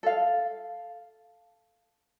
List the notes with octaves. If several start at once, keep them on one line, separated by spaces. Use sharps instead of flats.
A4 F5